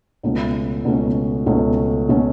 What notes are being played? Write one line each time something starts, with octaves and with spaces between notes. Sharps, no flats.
C#2 B2 A3 C#4
C#2 B2 A3 C#4
C#2 B2 A3 C#4
B2 A3 C#4